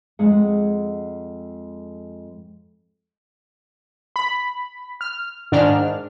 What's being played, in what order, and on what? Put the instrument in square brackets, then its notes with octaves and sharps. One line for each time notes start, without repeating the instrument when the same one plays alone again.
[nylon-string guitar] F2 G#3 G#4 F#5
[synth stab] B5
F6
G#2 D#3 D4 F6